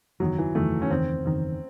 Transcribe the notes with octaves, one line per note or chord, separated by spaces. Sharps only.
F#1 E2 D#3 F#3
E3
F#1 E2 D#3 A3
C#4
F#1 E2 D#3 C4
F#1 E2 D#3